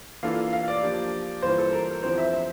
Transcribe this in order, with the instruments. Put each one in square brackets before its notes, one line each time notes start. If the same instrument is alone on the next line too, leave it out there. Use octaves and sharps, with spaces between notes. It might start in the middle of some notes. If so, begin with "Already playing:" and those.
[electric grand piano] E3 A#3 D4 F4 A4 [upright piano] F5
[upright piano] F5
D5
[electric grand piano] F3 A#3 D4 G4
[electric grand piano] G2 E3 A#3 F4 [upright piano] C5
[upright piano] A4
A#4
[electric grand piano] E2 D3 F3 C4 E4 [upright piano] C5
[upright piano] E5
E5